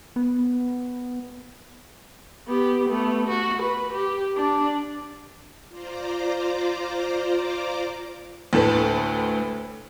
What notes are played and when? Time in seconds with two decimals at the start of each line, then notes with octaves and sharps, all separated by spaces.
0.16 B3
2.48 B3 G4
2.89 A3 B3
3.28 F#4
3.62 B4
3.93 G4
4.37 D4
5.68 F4 C5 D5 A#5 D6
8.53 D2 A2 A4 B4